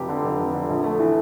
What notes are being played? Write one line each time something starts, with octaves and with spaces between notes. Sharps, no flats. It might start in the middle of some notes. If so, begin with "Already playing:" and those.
Already playing: F1 F2 G4
D3
F1
F2
D3
A#1
A3
E3